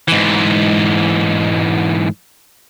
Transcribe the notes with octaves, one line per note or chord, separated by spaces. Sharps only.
G#2 E3